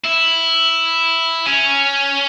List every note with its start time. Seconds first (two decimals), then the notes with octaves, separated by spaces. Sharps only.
0.04 E4
1.46 C#4